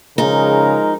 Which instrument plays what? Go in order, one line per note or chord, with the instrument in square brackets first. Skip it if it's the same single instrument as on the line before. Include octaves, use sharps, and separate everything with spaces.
[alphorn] C#3 [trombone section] F3 G#3 A#4 [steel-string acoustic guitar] D#4